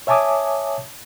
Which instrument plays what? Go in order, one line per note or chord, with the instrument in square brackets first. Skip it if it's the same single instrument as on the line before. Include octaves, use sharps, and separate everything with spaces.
[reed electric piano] C#5 E5 G#5 A5 D6 D#6